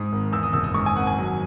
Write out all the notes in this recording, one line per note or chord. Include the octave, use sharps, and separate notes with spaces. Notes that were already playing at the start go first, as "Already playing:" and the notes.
Already playing: G#2 D#6
G#1
E2 E6
D#6
F#1 E6
D#6
G#2 C#6
G#5
G#1 F#5
G#5
F#3